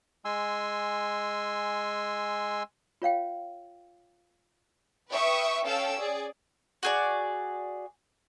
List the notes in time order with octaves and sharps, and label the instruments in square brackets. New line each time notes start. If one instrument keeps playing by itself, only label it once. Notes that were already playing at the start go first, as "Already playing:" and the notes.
[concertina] G#3 G#5 C6 E6
[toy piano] F4 C#5 F5 G5
[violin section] B4 E5 G5 C#6 D#6
C#4 A4 F5 G5 E6
G#4 D5
[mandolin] F#4 G#4 D5